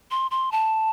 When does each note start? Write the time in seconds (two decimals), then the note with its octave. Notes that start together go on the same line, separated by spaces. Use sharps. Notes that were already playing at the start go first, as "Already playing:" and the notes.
0.11 C6
0.31 C6
0.52 A5